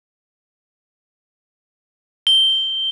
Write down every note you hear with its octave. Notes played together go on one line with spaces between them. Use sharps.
G7